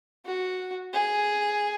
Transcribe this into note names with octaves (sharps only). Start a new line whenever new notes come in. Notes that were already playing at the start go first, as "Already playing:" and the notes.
F#4
G#4